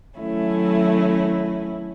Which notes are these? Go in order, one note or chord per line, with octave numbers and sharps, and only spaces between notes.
D#3 F#3 A3 C#4 E4